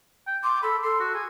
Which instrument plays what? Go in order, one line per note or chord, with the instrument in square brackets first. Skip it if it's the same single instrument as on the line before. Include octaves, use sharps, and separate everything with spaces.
[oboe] G5
[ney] C6 [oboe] D6
[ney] A4 [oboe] B5
[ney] A4 [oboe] C6
[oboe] F#4
G#4